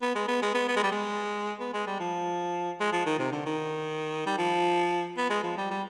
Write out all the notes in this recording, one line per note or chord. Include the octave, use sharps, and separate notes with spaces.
B3
G#3
B3
G#3
B3
B3
G#3
G3
G#3
B3
G#3
G3
F3
G#3
F3
D#3
C3
D3
D#3
G3
F3
B3
G#3
F3
G3
G3